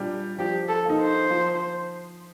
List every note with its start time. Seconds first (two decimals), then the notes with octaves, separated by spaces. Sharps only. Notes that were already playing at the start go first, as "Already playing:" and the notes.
Already playing: A#2 G3 D4 G4
0.38 F3 G4
0.69 A4
0.85 A#3 D#4
1.01 C5
1.31 F3